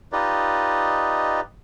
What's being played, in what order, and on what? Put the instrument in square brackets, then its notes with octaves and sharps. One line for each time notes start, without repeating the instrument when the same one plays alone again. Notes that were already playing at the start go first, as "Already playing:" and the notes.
[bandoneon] D#4 F4 G4 B4 D5 D#5